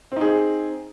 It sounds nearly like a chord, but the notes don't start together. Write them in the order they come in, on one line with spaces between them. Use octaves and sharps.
C4 D#4 G#4